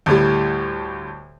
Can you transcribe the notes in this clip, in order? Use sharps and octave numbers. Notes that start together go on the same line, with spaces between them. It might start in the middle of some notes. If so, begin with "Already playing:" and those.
D2 A2 G3